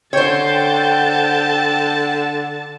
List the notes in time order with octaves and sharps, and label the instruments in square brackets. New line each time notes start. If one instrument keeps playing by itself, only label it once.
[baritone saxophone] D3 [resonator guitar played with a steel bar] C5 C#5 [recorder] G5 [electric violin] A5 A6